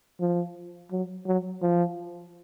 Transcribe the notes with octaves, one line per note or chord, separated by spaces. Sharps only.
F3
F#3
F#3
F3